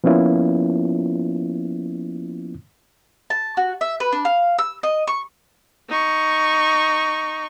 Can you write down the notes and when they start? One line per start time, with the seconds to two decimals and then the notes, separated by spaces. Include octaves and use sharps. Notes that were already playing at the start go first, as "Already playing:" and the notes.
0.04 F3 A#3 B3 C#4 E4 F4
3.30 A5
3.57 F#4
3.81 E5
4.00 B4
4.12 D4
4.25 F5
4.59 E6
4.83 D#5
5.08 C#6
5.89 D#4 C#6